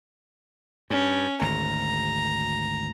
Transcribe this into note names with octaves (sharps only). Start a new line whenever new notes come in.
G2 C#4
G#1 D2 A#5